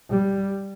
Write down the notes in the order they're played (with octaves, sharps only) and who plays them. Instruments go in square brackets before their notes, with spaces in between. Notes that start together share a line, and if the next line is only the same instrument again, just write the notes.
[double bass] G3